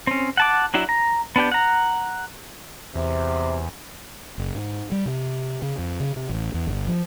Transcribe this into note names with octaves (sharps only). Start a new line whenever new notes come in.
C4 C#4
F#5 A5 D6
F#3 D4 E4 F#4
A#5
B3 D4 G4 G5
F#5 A#5
E2 C3
F#1
G#2
G3
C3
C#3
F2
C#3
C3
A1
E2
G1
F3